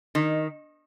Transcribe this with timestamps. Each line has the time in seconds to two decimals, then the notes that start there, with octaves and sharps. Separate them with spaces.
0.15 D#3